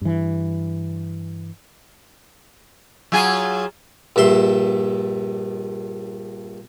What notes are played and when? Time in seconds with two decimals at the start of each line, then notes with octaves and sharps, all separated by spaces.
0.01 G2 E3
3.12 F#3 F4 G#4
4.16 A#1 G2 E5 C6